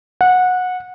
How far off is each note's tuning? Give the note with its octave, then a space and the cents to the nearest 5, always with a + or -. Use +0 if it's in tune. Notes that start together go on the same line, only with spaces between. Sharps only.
F#5 -20